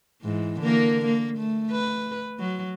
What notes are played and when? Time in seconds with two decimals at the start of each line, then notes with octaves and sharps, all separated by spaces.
0.22 G#2 E3
0.61 D3 A#3 A#4
1.06 A#3
1.38 A3
1.71 B4
2.39 F#3